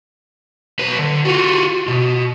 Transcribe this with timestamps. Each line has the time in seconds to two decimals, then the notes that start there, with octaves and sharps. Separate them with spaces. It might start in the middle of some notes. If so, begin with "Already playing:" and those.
0.79 B1 B4
0.99 D3
1.25 F4 F#4
1.88 B2